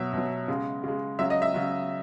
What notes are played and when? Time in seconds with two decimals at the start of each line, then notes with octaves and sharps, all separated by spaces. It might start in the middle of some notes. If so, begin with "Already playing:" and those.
Already playing: B2 F#3 E5
0.13 B2 F#3
0.48 C#3 G#3
0.84 C#3 G#3
1.19 C#3 F#3 E5
1.30 D#5
1.42 E5
1.54 C#3 F#3